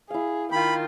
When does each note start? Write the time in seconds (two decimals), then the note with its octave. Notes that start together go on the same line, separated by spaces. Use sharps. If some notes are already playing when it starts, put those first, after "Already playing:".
0.10 E4 G#4 F5
0.52 D#3 F4 G5 B5